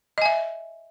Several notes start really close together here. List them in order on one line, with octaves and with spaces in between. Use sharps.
D#5 G#5 E5